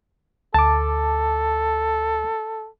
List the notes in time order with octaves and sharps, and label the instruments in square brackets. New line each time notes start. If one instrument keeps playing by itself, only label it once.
[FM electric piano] D2 [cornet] A4 [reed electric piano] A5 D6